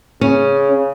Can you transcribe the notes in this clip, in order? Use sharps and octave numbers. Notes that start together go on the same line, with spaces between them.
C#3 C#4